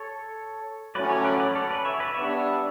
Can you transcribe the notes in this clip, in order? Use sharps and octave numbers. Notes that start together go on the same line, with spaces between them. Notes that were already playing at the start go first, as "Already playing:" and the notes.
Already playing: A4 C#5
A2 F#3 C#4 F#4 B4 D5
A4 C#5
B4 D5
B4 D5
A4 C#5
B4 D5
C#5 E5
B4 D5
G3 B3 D4 C#5 E5